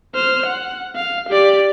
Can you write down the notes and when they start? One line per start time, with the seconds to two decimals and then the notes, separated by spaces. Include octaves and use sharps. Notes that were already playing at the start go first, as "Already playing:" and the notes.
0.14 C5 F6
0.46 F#5
0.95 F5
1.29 G4 D5